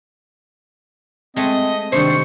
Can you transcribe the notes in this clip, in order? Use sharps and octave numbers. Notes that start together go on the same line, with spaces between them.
G#3 A3 C4 D#5
C3 D#3 G3 D4 C5 C#6